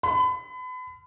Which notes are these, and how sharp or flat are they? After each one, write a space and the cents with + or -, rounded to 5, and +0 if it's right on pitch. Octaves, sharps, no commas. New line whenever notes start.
B5 +35